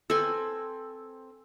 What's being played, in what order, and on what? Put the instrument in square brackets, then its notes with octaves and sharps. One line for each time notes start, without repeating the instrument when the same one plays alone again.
[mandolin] C4 B4 E6 [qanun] A4 G#5